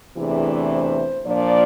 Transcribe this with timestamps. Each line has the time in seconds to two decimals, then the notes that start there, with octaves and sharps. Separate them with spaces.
0.16 E2 C3 E3 A3 D4 G#4
0.71 C5
1.26 A#2 F3 A#3 D4 D5